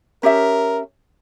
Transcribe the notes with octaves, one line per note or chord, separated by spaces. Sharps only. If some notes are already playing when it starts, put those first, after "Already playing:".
C#4 G4 A#4 E5